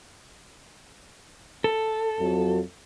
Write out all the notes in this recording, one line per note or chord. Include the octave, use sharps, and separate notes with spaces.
A4
F2 F#3 F#4